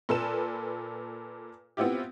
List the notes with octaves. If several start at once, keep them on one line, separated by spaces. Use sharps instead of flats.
A#2 A4 B4 E7
B3 C4 E4 F4 G4